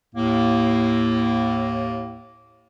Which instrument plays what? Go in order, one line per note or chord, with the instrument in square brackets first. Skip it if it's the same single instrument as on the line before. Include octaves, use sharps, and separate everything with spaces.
[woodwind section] D#2 A2 A#3